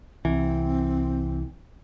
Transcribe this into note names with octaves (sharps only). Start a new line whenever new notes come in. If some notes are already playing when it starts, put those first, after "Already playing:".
C2 E3 C4